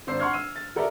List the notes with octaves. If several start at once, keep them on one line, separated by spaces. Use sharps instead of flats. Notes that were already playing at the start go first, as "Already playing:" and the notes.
G#1 D4 C5 E6 C7
F#5 C6 C#6 F6 G#6
E6 D#7
A6
F#4 A4 A#4 D5 E5 A#5